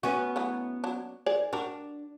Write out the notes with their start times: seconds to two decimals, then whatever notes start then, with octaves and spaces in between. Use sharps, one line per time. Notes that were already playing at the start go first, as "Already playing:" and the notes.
0.03 B3 C#4 F#4
0.36 E3 F#3 A3
0.84 F#3 D4
1.26 D#3 G#4 D5
1.53 D4 F#4 G4 A#4